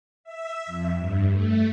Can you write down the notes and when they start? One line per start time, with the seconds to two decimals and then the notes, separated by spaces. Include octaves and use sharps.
0.24 E5
0.66 F2
0.98 G2
1.31 A3